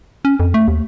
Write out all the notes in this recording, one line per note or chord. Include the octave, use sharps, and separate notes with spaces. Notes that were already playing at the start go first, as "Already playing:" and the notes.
C#4
F2
A3
D#2